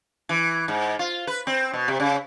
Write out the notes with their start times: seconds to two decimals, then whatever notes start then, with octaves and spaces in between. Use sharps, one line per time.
0.29 E3
0.68 G#2
0.99 F4
1.27 B4
1.47 C4
1.73 B2
1.88 C3
2.00 C#3